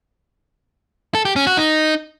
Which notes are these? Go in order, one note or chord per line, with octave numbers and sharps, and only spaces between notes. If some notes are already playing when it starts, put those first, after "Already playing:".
A4
G4
C#4
F#4
D#4